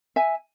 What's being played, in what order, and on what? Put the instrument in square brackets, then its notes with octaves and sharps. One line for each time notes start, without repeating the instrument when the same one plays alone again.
[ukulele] E5 G#5